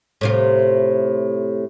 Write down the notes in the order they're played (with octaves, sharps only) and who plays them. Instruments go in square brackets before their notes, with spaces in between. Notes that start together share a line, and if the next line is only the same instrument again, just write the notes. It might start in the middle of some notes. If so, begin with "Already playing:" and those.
[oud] A2 C3 F4